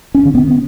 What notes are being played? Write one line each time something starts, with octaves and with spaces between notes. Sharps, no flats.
C#4
D3
B3